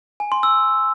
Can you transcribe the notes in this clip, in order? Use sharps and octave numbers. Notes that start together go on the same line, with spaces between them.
G#5
C6
E6